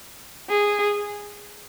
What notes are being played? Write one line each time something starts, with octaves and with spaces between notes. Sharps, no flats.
G#4